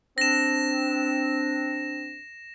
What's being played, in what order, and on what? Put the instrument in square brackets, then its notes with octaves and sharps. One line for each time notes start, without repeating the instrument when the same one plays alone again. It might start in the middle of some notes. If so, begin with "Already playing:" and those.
[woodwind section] C4 D4 [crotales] A#6 E7